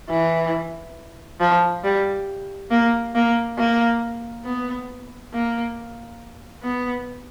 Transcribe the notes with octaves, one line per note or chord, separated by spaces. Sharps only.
E3
F3
G3
A#3
A#3
A#3
B3
A#3
B3